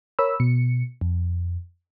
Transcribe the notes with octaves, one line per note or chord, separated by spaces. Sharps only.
A#4 C#5 B5 E6
B2 C#7
F2